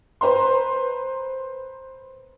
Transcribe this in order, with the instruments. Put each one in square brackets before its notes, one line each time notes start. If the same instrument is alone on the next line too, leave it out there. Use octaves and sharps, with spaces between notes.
[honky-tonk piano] B4 C5 A#5 C6